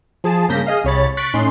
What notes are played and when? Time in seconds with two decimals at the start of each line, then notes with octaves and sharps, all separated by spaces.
0.24 F3 G#4 A5
0.49 G2 C#3 A#3 G6 A#6 B6
0.67 G#4 D#5 F5
0.84 C2 C3 C#5 B5 A6
1.17 C#6 F#6 A6 B6 D7
1.34 A2 C#4 D#4 C6